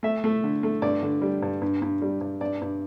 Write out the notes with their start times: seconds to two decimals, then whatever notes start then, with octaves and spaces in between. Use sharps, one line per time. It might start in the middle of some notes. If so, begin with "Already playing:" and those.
0.03 A3 E5
0.24 A3
0.44 D3
0.63 A3
0.82 G2 D5
1.03 D3
1.22 G3
1.42 G2
1.62 G2
1.82 G2
2.02 G3
2.21 G2
2.41 G2 D5
2.61 G2